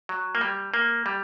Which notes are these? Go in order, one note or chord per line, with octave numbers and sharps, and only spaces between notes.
F#3
A#3
G3
A#3
G3